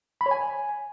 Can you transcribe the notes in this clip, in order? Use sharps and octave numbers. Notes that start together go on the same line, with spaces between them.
B5
C#5
G#5